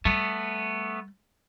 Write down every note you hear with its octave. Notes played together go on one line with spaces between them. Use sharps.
G3 A3 B3